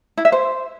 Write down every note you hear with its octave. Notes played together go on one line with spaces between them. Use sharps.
E4
E5
C5